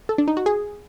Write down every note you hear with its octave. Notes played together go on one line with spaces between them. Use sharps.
A4
D4
D#4
F#4
G#4